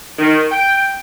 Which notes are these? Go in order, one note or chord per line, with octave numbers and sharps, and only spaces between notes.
D#3
G5